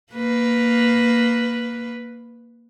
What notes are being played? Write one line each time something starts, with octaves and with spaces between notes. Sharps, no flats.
A#3 B4